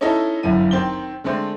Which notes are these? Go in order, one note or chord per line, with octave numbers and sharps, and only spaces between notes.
C#4 D#4 E4 A4 D#5
G1 F#2 E4 D#7
D#3 C4 G7
D3 G#3 A3 C4